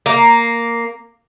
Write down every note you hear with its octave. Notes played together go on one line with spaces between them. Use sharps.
A#3